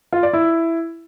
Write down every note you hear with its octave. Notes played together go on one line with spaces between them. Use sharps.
F4
D5
E4